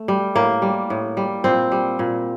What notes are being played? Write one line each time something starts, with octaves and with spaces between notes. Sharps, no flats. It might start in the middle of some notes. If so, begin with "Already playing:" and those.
Already playing: A3
G3
A2 A#3
G3
A2
G3
A#2 C4
G3
A#2